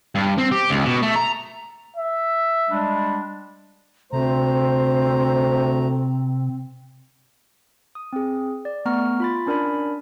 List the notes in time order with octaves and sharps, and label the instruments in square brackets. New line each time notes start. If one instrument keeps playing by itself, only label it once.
[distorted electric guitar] G2
C4
G4
C#2
B2
A3
A#5
[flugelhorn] E5
[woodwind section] G3 G#3 D4
[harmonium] D2 A3 A#5 [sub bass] C3 [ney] C4 [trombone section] C5
[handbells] D#6
C4 G#4
D5
A3 B3 A#5 C#6 F6
F4 B5 A6
C#4 D4 A#4 D5 G#5 B5